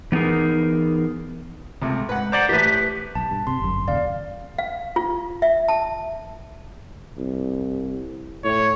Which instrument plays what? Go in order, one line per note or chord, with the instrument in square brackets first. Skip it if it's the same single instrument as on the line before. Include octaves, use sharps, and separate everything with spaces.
[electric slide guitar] E3 B3 D#4 G#4 A#4
[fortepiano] C#2 A3 [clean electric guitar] C3
[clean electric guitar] G#2 [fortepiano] B4 F#5
[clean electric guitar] C5 D5 F#5 [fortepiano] A#5 D6
[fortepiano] A2 E3 [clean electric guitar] G4 B4
[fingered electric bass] B1 [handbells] A5
[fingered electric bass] G2
[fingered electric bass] C3 [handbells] C6
[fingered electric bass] G1 F#2
[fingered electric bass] G#1 D#2 C#3 [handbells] D5 F5
[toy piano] F5
F4
E5
A5
[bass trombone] C2
[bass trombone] A2 [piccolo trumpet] C#5